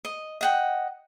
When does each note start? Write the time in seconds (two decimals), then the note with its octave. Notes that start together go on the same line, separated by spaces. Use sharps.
0.05 D#5
0.41 D#5 F#5 G5